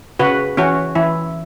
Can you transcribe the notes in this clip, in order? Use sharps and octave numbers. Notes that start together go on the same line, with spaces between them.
C#3 F#4 B4
E3 C#4 F#4
E3 E4